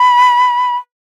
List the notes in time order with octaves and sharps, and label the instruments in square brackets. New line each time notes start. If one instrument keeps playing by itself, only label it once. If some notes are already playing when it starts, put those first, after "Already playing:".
Already playing: [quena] B5